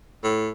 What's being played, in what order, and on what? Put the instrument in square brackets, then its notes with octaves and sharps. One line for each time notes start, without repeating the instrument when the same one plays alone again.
[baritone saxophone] A2